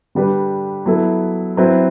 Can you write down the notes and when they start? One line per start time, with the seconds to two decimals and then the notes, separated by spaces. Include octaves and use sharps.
0.15 D3 G3 D4 G4 B4
0.86 F#3 B3 E4 A4
1.57 F#3 C4 E4 B4